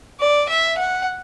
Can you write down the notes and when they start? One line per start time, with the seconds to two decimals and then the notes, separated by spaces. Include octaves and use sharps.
0.20 D5
0.49 E5
0.78 F#5